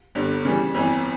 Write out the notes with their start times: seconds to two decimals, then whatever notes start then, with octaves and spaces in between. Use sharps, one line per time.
0.15 G1 G2 D3
0.45 C#3 E3 G3
0.74 G1 F2 E3